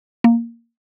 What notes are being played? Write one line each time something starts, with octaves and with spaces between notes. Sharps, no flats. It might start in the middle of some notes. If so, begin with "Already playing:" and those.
A#3